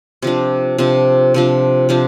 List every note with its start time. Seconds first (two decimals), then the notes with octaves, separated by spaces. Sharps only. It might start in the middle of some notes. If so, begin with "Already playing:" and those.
0.22 C3 F3 D4
0.78 C3 F3 D4
1.34 C3 F3 D4
1.89 C3 F3 D4